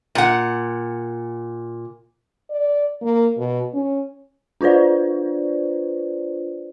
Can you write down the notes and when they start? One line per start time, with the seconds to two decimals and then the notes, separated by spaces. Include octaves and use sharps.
0.15 A#2 F#5
2.50 D5
3.02 A#3
3.38 B2
3.73 C#4
4.61 D4 F4 B4 C5 D5